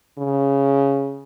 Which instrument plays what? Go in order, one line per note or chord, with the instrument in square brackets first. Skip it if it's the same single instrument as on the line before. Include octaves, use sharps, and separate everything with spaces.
[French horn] C#3